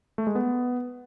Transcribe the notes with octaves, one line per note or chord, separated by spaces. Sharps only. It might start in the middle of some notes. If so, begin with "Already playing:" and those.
A3
G#3
B3